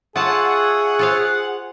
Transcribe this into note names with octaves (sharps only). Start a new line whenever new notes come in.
F4 G#4 C#5 E5 F#5 A5 D#6
F4 C5 F5